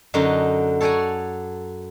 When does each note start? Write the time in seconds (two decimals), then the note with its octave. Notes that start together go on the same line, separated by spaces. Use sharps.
0.14 F#2 D3 D4 D#4 F#4 D#5
0.81 A4 C#5 D5 F#5 G#5 A#5